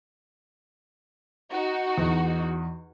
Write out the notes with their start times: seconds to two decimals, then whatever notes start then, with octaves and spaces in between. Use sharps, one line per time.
1.52 D#4 F#4
1.98 E2